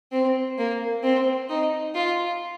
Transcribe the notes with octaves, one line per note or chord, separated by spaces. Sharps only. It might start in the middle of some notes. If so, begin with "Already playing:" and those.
C4
A#3
C4
D#4
F4